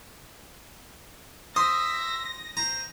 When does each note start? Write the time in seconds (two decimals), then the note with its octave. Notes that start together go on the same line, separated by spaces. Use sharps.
1.56 C5 E5 D#6 A#6
2.57 C5 A#5